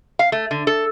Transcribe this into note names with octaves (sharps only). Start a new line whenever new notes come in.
F5
A3
D3
A4